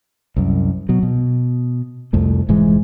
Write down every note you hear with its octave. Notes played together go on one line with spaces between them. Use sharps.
C2 F#2
B2 F#3
B2
C2 F2 A3
F1 G#2 E3 G#3